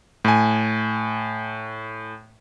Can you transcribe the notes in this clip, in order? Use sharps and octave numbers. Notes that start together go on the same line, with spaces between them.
A2 G#5